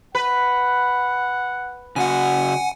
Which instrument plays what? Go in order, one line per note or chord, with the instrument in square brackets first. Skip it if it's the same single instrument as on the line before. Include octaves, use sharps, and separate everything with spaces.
[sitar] B4 [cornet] F#5
[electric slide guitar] C#3 F#4 [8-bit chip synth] F#5 G#5